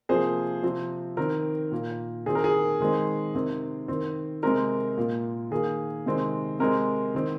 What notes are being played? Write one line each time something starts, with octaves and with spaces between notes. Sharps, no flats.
C3 F3 A#3 G#4 C5
C3 F3 C4
D#3 C4 A#4
A#2 A#3
D#3 C4 G#4
A#4
G#4
D#3 G#3 C4
C3 D#3 C4
D#3 C4
C3 G#3 C4 A#4
A#2 A#3
D#3 A#3 G#4
C3 D#3 G#3 C4
C3 G#3 C4 A#4
D#3 C4